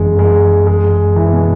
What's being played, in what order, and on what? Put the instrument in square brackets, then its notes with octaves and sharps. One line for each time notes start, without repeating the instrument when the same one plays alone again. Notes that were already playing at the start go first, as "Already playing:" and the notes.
Already playing: [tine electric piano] G#1 F#2 E3 [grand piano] G#3
[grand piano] G#3
G#3
E3
B2